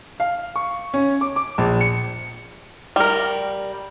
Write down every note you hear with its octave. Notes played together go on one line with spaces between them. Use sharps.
F5
C#6
C#4
D6
D6
A#1
C#7
G3 A#4